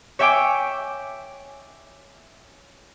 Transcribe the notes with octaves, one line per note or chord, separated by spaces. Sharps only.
C#5 E5 G5 G#5 D6